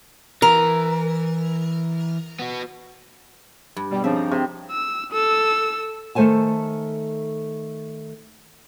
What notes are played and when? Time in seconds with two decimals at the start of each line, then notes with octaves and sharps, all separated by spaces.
0.42 E3 A#4
2.39 B3 F#4
3.76 G2
3.91 B2 G3
4.04 C#3 F3 C4 D4 D#4 E5
4.16 A#5
4.31 C3 G#4 C5
4.71 E6
5.13 A4 E6
6.15 D#3 A3 A4 C5 G#5 A5